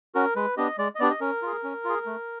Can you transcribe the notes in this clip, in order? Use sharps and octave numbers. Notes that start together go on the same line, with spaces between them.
C#4 F#4 A#4
G#3 B4
B3 D4 G4 D#5
G#3 D5
D#5
B3 D4 G4 D5
D#5
C#4 A#4
F4 G#4
C#4
F4 G#4
A3